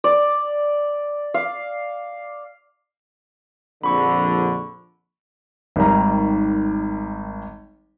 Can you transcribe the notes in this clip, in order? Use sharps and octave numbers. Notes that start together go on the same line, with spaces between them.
D5
F5
A#1 F2 D3 B5 C#6
G#1 D#3 G3 A#5